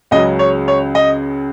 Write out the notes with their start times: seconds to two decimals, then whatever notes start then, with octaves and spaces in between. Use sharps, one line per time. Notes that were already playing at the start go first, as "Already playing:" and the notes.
0.11 C#2 C#3 F#3 D#5
0.39 C#5
0.68 C#5
0.95 D#5